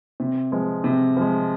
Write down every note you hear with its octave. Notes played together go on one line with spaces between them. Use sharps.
C3
F3 G#3
C3
F3 G#3